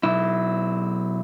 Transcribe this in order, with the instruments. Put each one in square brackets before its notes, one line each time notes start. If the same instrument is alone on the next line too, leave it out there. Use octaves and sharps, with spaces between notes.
[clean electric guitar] B1 E4